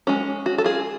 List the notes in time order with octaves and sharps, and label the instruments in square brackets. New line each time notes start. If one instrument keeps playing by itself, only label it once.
[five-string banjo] G#3 C#4 F#4
F#4
A4
F4 G#4